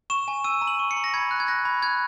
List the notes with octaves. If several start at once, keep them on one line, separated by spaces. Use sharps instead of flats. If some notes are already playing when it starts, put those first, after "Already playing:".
C#6 E7
G#5
E6 D#7
A#5
F#7
C#6
C#7
A#5
A#6
B5 G#6
F#6
G#6
F#6 A#6
B5
F#6 G#6